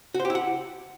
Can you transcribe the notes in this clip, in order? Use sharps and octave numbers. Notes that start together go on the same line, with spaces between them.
F#4
C5
G4
E4
F#5